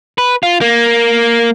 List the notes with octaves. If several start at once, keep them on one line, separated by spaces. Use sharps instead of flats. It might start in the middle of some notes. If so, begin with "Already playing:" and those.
B4
F4
A#3